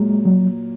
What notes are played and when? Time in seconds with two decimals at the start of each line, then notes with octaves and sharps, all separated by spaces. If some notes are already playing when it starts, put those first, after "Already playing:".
Already playing: A#2 F#3 G#3 A#3
0.25 F#3